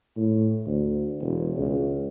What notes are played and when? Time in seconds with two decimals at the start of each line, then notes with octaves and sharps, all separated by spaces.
0.17 A2
0.66 D2
1.20 E1
1.56 C#2